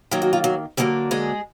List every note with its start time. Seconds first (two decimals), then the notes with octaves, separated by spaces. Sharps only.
0.11 D#3 F#3 A#3 F4
0.22 F#4
0.33 F4
0.44 F#3 F#4
0.77 D3 F#3 G3 A#3 D4 G4
1.11 G#3 G#4